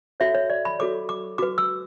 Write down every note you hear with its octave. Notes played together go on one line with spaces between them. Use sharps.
F#4 A4 C#5 E5
C#5
D5
B5
F#4 A4 C#5 D6
D6
F#4 B4 D6
E6